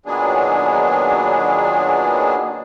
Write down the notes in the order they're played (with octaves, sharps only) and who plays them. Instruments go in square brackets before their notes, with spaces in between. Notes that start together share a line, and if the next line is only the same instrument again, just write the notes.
[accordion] A#2 D#3 F#3 B3 D4 G#4